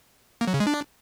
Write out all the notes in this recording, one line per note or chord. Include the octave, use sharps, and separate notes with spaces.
A#3
F#3
C#3
G#3
D4